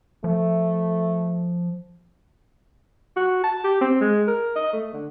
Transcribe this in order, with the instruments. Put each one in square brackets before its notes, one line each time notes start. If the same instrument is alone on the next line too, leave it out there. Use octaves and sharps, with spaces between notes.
[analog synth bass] F3 [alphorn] A3
[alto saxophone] F#4
A5
G4
C4
G#3
A#4
D#5
A3
D3